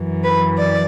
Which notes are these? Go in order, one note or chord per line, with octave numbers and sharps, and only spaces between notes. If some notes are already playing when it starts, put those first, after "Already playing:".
Already playing: F#2 E3
B4
D5